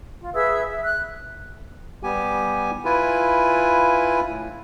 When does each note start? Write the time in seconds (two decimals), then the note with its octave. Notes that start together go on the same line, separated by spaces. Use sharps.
0.21 F4
0.34 G#4 B4 E5 E6
0.66 E5
0.84 F#6
2.03 G3 B3 G4 G#5
2.85 E4 F4 B4 G#5
4.28 A2